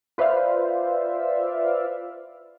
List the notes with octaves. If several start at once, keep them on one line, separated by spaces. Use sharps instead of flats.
F4 B4 C5 D5 E5 F5